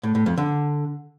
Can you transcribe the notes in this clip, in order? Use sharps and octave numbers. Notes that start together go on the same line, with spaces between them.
A2
A2
F2
D3